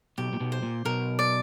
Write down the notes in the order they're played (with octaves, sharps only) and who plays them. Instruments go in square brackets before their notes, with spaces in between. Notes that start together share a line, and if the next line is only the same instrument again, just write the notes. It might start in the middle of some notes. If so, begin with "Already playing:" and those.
[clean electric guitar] B1 B2 [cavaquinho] G4
[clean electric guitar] A#2
B1 B2
[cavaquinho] C5
[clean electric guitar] A#2
[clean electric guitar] B1 B2 [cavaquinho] A#4
[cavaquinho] D5